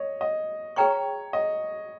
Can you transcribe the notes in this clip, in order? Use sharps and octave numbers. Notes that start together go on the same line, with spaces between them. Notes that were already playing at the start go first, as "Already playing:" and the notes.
Already playing: C#5 D#5
D#5
G#4 B4 C#5 G5 A#5 C#6
D#5